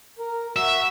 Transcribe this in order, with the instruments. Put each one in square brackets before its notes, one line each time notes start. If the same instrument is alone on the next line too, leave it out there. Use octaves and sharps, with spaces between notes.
[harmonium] A#4
[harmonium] F#4 [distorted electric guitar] E5